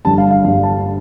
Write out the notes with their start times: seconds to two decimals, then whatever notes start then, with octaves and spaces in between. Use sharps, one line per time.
0.05 G1 G2 D3 G3 A5
0.18 F5
0.31 F5
0.44 G1 G2 D3 G3 F5
0.63 A5